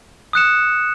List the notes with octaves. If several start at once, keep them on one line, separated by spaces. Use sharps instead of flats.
D#6 F#6 C#7 E7